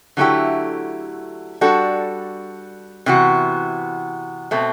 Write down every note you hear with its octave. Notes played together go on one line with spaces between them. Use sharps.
D3 F#3 A3 E4 G4
G3 D4 F#4 A4
C3 E3 B3 F#4
B2 A3 C4